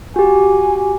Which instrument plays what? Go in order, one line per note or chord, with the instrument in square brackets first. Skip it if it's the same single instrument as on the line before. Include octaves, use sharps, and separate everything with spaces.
[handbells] F#4 G4 [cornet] G#5